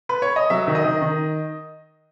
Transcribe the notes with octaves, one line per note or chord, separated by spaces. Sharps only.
B4
C#5
D#5
F#3 E5
D#3
D#5
D#3
D#3